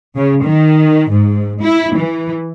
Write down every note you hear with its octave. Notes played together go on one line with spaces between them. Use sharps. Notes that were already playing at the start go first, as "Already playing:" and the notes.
C#3
D#3
G#2
E4
E3